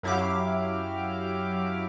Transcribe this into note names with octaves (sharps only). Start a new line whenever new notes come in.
F#2 F#3 E4 G4 F5 D6